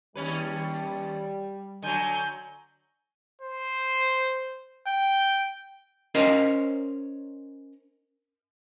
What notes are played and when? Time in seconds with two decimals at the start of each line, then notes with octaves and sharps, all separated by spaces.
0.15 D#2 G3 C#4 B4
1.83 D3 F#3 G#5 G6
3.41 C5
4.87 G5
6.15 C#4 A#4 C5 C#5 D#5